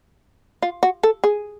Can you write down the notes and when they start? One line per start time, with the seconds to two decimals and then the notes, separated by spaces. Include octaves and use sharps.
0.62 F4
0.83 F#4
1.03 A4
1.24 G#4